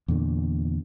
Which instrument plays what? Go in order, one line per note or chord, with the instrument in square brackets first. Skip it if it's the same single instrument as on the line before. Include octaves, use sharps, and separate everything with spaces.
[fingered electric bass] E2 A#2 D3